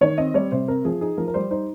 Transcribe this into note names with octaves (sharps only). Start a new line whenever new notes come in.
D#3 C#5
C4 D#5
G3 C#5
C3 C5
C4 A#4
F3 G#4
D#4 G#4
F3 A#4
A#4
G3 C5
D#4 C5